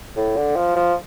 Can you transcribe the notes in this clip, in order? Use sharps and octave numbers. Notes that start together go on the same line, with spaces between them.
A2
D3
F3
F3